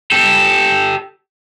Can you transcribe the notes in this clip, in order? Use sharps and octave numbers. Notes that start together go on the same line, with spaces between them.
G4 A4